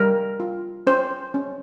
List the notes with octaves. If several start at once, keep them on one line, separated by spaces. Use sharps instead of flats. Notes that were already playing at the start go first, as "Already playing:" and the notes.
Already playing: G3 A#4
F4
C#4 C5
C#4